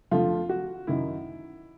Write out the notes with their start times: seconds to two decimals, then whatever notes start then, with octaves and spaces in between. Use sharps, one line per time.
0.11 F2 D3 F3 A3 F4
0.49 F#4
0.87 F#2 D#3 F#3 E4